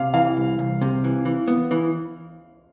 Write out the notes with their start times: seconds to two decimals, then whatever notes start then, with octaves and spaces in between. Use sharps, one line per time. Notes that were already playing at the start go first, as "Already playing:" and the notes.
Already playing: C3 F5
0.14 E3 F5
0.37 C2
0.59 C2
0.81 C3
1.04 E3
1.25 E3
1.48 B3
1.71 E3